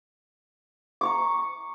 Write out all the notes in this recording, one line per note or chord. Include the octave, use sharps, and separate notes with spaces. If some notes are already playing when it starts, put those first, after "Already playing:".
A#5 C#6 D6